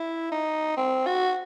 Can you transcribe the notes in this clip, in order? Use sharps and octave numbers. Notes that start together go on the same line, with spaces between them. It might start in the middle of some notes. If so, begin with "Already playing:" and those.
Already playing: E4
D#4
C4
F#4